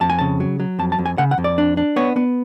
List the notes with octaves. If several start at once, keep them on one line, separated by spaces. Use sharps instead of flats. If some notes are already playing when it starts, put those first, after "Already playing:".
F2 A5
G#5
C#3 A5
F#3
F#3
F2 A5
A5
F2
G#5
C#3 F#5
F#5
F2
D5
D4
D4
B3 C#5
B3